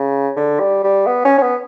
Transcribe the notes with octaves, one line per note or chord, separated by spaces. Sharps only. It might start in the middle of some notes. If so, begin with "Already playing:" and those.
Already playing: C#3
D3
G3
G3
B3
C#4
C#4
B3